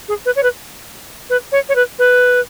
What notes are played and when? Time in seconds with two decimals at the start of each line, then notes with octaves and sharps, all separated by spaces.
0.09 G#4
0.26 B4
0.36 C#5
0.43 B4
1.30 B4
1.52 C#5
1.69 C#5
1.76 B4
1.99 B4